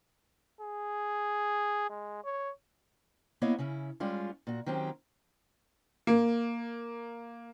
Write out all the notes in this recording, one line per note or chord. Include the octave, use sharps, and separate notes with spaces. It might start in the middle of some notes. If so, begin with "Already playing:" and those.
G#4
G#3
C#5
A#3 B3 E4 C#5 D#5 F5
C#3 C#4 E4
G3 G#3 C#4 F4
A#2 F#4
D#3 F#3 C4 C#4 G4
A#3